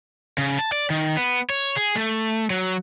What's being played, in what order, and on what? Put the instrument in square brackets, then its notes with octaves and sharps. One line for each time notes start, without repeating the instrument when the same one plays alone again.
[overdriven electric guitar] C#3
A5
D5
D#3
B3
C#5
G#4
A3
F#3